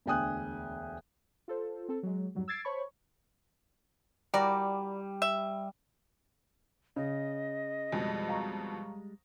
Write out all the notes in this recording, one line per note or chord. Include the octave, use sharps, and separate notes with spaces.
E1 D2 G5 G#5 D#6 F#6
F4 A4 C5
C4 A4
F#3 G#3
F2 G#2 F#3 G3
E6 G#6 A6 C7 D7
C5 C#5 A5 B5 C#6
G3 F#4 A#4 D5
E5
C#3 D#5
F2 B2 G3 G#3
F5 A#5 C#6